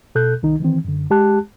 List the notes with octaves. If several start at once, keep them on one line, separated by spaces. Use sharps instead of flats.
B2 A4 F#6 G6
C2 D#3 D#4
D#3 E3 C4
F#2 D3
G#3 G4 A5 F#6